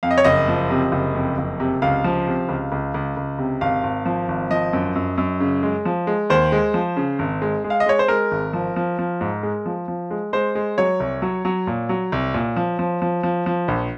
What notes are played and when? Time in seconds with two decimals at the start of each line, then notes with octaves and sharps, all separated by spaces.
0.03 F2 F5
0.11 D#5
0.18 C#5
0.24 F#1 D#5
0.48 F3
0.70 C3
0.92 F#1
1.15 F2
1.38 F#1
1.60 C3
1.82 C#2 F5
2.04 F3
2.27 C3
2.49 C#2
2.72 C#2
2.94 C#2
3.17 C#2
3.39 C3
3.61 G#1 F5
3.83 G#1
4.06 F3
4.28 G#1
4.51 F3 D#5
4.73 F#2
4.96 F#2
5.18 F#2
5.40 C#3
5.63 G#3
5.85 F3
6.07 G#3
6.30 D#2 C5
6.52 G#3
6.74 F3
6.97 C#3
7.19 G#1
7.42 G#3
7.64 G#3
7.70 F5
7.80 D#5
7.86 G#3 C#5
7.99 C5
8.08 G#3 A#4
8.32 G#1
8.53 F3
8.76 F3
8.99 F3
9.21 G#2
9.43 G#3
9.66 F3
9.88 F3
10.11 G#3
10.33 G#3 C5
10.55 G#3
10.78 F#3 C#5
11.00 C2
11.22 F#3
11.45 F#3
11.67 A#2
11.89 F#3
12.12 C2
12.34 A#2
12.57 F3
12.79 F3
13.02 F3
13.23 F3
13.46 F3
13.68 A#1